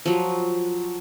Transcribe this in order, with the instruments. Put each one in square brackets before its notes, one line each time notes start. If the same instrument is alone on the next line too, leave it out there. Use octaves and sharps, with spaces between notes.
[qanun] F3 F#3